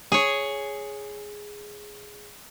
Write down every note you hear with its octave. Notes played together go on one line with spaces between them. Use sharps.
G#4 C#5